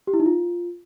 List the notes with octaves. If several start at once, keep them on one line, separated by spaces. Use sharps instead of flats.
G4
E4
D#4
F4